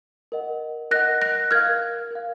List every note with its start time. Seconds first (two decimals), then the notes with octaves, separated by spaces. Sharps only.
0.32 A#4 D#5 F#5
0.91 A#4 D#5 F#5 F#6 A#6
1.22 F#6 A#6
1.51 A#4 F5 F6 G#6
2.11 A#4 F5